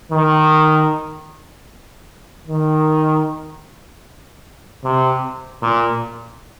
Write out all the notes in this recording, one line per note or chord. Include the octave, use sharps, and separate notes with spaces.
D#3
D#3
C3
A#2